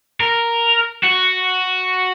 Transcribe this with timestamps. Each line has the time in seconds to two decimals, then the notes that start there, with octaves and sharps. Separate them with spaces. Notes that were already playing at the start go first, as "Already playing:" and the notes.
0.20 A#4
1.03 F#4